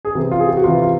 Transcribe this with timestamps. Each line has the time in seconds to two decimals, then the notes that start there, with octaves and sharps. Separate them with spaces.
0.05 G#4
0.15 C3 E3 G4
0.31 F4
0.40 G#4
0.48 G4
0.57 F#4
0.64 C3 E3 F4
0.82 F4